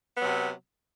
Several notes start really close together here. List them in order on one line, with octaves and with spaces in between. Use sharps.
B3 F#3 C3